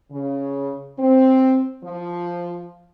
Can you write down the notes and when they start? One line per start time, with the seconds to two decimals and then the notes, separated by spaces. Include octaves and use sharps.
0.12 C#3
0.99 C4
1.85 F3